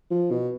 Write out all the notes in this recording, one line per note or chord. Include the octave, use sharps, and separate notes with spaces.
F3
B2